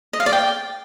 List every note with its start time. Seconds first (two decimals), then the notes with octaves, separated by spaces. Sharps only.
0.13 D#5
0.20 F5
0.26 D5
0.33 G5